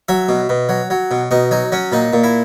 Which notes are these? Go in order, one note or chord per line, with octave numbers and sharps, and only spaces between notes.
F#3 E5
B2
B2
F#3
F#3
B2
B2 D#4
F#3 D#4
F#3 C#4
A#2 D#4
A#2
E4